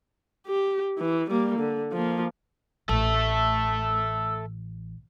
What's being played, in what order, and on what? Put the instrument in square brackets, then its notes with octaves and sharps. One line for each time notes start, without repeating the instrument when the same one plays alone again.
[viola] G4
E3
G3 A#3
D3
F3 A#3
[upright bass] A1 [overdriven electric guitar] A4 E5 [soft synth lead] E6